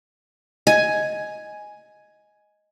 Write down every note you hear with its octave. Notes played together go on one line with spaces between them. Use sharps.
D#5 G#5